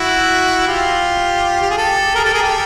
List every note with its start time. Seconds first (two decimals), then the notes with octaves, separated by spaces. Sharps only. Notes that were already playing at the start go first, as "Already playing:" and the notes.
Already playing: E4 F#4
0.68 F4 G4
1.62 G4
1.71 G#4
1.78 G4 A4
2.15 G#4 A#4
2.24 G4 A4
2.34 G#4 A#4
2.43 G4 A4